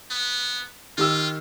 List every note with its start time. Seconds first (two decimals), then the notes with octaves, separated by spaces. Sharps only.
0.11 B3
0.98 D#3 F4 G4 E6